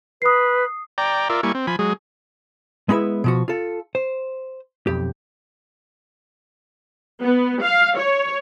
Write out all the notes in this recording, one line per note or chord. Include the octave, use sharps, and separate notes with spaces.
B4 D#6 C7
D5 G5 A#5
F4 A#4 D5 E5
G3 A#3 E4 G#5 C#6
C4
F3 G#5 B5
F#3 G#3 G#4
G#3 B3 E4 A#4 B4 E5
B2 F3 F#4
F4 A4
C5
B1 F2 G4
B3
F5
C#5